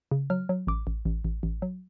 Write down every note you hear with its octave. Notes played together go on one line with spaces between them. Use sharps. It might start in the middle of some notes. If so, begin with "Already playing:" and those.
C#3
F#3 F6
F#3
A1 D6
A1
A1
A1
A1
F#3